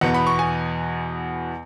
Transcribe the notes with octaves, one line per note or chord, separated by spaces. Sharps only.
E2 B2 B3 F#5
B5
C#6
G#5